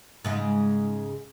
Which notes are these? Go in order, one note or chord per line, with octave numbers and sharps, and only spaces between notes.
G#2 C#3 G#3